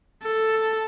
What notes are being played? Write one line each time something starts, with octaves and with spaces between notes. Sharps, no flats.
A4